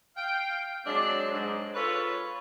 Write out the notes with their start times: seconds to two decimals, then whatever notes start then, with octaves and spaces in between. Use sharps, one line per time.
0.16 F5 G5
0.86 F#3 G#3 C4 D4
1.30 G#2
1.75 F4 A4 B4 C#5